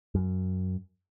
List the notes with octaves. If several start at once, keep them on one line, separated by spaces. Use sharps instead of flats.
F#2